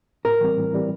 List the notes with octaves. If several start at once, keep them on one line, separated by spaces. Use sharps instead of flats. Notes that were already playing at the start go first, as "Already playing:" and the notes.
A2 A#4
E3 G3 C4
A2
E3 G3 C4